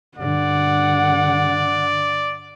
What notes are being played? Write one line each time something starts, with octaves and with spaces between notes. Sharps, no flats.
G2 D3 D5 F#5